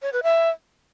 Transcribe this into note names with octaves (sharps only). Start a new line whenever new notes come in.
C#5
B4
E5